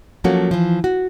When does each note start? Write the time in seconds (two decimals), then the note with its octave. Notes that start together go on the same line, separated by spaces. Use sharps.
0.24 F3 F#3 A3 A#3 C#4 F#4
0.51 E3 F3
0.84 F#4